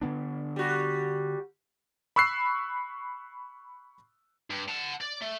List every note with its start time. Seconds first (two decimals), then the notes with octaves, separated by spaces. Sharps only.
0.02 D3 B3 D4
0.56 G3 F#4
2.16 B5 C#6 E6 F#6 C7
4.50 G2
4.68 F#5 A5
5.01 D5
5.22 A3